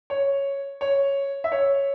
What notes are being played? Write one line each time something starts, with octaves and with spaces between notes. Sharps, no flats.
C#5
C#5
E5
C#5